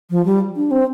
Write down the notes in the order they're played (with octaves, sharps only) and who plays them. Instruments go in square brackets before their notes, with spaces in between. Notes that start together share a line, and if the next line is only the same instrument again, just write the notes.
[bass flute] F3
G3
D4
C4